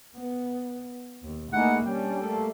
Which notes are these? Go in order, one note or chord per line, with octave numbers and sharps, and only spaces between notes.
B3
D#2
A3 A#3 D#4 E4 G#4 F#5
G3 C#4 D4 G5
A3 A#3 A4